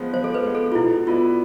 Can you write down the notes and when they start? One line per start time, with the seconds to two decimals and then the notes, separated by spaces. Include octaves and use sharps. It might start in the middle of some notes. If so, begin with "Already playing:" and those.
Already playing: F3 G#3 B3
0.14 F3 C5
0.24 A4
0.34 B4
0.45 G#3 B3
0.55 A4
0.72 F4
0.75 B2 E4
1.07 B3 E4 F4 B4 D5